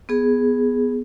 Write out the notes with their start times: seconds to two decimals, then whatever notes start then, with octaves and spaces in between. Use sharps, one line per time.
0.09 B3 G#4